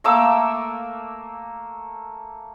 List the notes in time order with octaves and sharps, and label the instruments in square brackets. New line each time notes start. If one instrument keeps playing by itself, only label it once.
[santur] A3 A#3 D6 E6